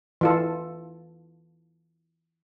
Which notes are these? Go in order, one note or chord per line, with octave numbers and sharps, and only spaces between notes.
E3 F4 A4